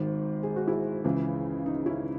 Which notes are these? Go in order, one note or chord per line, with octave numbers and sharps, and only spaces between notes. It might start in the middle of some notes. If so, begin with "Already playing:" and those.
Already playing: G#1 G#2 D#3
G#4
F#4
E4 G#4
C#2 C#3 E3
D#4
C#4 E4